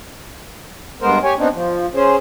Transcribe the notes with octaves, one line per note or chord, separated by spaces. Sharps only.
G2 G#3 B3 A#4 C5
G4 C#5 G#5
B3 C4 D4 D#4
F3
C#4 G#4 C5